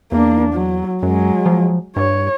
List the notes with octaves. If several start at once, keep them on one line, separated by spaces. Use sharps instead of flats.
E2 A#3 D4
F#3
F#2 F#3 G#3
F3
G2 C#5